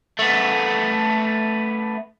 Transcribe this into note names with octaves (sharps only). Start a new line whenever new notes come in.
A3 B3